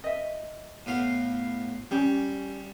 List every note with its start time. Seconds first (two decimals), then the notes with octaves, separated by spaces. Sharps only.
0.04 D#5 E5
0.86 A2 B3 F5
1.91 G3 C#4 G4